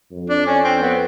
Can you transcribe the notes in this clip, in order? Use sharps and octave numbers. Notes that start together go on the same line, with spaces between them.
F2
D4
C#4
C4
B3